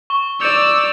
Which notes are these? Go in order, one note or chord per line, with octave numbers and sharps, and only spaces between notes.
C#6 G7
D5 E6 G6 C#7 F7